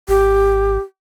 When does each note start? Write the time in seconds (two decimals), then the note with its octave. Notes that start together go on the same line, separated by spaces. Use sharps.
0.08 G#1 G4